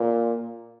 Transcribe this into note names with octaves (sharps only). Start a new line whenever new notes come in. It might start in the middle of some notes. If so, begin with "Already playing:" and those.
Already playing: A#2